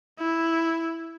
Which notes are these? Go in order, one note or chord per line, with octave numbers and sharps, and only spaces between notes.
E4